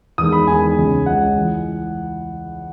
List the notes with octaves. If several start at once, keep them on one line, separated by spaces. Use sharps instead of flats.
E2 D#3 G#3 D#6
B5
E2 D#3 G#3 G#5
C#2 C#3 G#3
C#2 C#3 G#3 F#5
E3